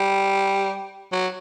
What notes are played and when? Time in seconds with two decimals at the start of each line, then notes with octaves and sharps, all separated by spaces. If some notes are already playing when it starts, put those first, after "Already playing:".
Already playing: G3
1.12 F#3